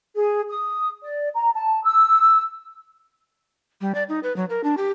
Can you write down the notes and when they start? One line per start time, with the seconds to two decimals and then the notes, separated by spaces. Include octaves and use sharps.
0.15 G#4
0.48 D#6
1.04 D5
1.34 A#5
1.55 A5
1.84 E6
3.81 G3
3.95 D5
4.09 D#4
4.23 B4
4.36 F#3
4.50 A#4
4.64 D4
4.77 G4